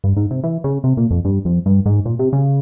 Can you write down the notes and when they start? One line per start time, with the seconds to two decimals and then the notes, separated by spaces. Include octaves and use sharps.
0.04 G2
0.17 G#2
0.31 C3
0.44 E3
0.64 C#3
0.84 C3
0.97 A#2
1.11 F2
1.25 G2
1.45 F2
1.66 G2
1.86 G#2
2.06 A#2
2.19 C3
2.33 C#3